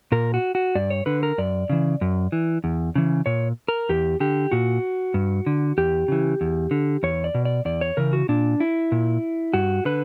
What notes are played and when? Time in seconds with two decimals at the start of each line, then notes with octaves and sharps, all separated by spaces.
0.12 A#2 A#4
0.34 F#4
0.55 F#4
0.75 G2 D5
0.90 C#5
1.06 D3 B4
1.23 A#4
1.38 F#2 D5
1.69 C#3 E3
2.01 F#2
2.32 E3
2.64 E2
2.95 C#3 E3
3.26 A#2 C#5
3.68 A#4
3.89 E2 G4
4.20 D3 G4
4.51 A#2 F#4
5.14 G2
5.46 D3
5.78 E2 G4
6.08 C#3 E3
6.41 E2
6.71 D3
7.03 E2 C#5
7.24 D5
7.35 B2
7.45 D5
7.65 E2 D5
7.81 C#5
7.97 C#3 E3 A#4
8.13 F#4
8.29 A#2 D4
8.60 E4
8.92 A#2
9.54 G2 F#4
9.85 D3 B4